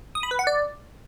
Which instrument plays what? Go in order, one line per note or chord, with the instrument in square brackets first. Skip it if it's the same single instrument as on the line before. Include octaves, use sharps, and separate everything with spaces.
[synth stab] D#6
B5
B4
F#5
D5